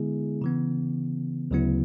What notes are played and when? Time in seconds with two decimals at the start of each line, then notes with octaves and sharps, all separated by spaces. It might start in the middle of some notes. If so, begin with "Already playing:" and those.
Already playing: D3 G#3 B3 E4 G#4
0.42 C#3 E3 B3
1.51 D2 C#3 F#3 B3 E4